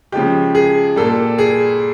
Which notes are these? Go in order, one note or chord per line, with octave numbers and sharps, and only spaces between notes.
C#3 F3 G#3 G4
G#4
A#2 G3 A4
G#4